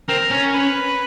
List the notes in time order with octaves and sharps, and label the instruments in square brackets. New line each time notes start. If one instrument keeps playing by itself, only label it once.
[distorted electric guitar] C4 [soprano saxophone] A#4
[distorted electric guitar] C#4
[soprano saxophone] B4